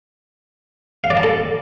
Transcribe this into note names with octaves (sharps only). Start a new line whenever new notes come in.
F5
D5
A5
A4